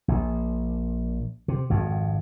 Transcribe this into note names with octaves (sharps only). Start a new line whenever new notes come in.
A#1
C3
G#1 F2